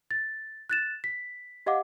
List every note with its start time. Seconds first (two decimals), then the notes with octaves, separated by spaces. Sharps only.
0.11 A6
0.70 F#6 A6 E7
1.04 B6
1.66 G4 D#5 F5 F#5 D6